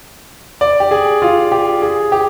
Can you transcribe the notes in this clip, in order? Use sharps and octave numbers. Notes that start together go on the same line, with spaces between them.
D5
G4
G#4
F4
G4
G#4
G4